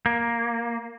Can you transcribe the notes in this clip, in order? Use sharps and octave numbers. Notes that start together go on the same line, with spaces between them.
A#3